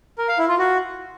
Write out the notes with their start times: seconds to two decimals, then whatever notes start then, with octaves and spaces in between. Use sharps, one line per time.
0.18 A#4
0.28 F5
0.38 E4
0.48 F4
0.58 F#4